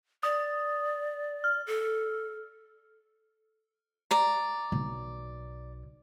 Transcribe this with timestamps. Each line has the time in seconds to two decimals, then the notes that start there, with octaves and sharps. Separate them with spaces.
0.23 D5 D#6
1.44 F6
1.67 A4
4.11 D5 A#5
4.72 B1